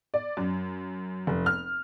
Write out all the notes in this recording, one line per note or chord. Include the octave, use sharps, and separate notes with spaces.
D5
F#2
F1
F6